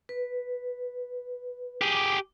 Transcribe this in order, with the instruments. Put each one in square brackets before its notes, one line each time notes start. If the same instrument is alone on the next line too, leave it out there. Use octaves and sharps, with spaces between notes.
[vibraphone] B4
[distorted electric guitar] G4 G#4 [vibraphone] D6